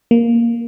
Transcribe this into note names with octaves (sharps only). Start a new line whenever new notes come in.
A#3